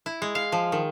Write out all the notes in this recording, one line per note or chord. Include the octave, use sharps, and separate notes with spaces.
E4
G#3
F5
F3
D#3